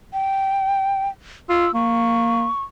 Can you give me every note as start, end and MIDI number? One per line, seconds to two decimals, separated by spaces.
0.13 1.08 79
1.50 1.67 65
1.50 1.72 88
1.75 2.47 58
1.75 2.62 85